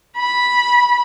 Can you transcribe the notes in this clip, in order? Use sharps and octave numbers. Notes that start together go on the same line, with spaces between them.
B5